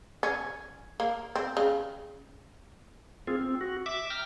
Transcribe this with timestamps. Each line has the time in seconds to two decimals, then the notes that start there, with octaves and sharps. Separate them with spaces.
0.23 C#4
1.00 A#3
1.35 C4
1.57 C#3
3.27 C4 F4 G#4
3.41 C4
3.61 F#4
3.86 E5 D6
4.10 G5 A#5 F6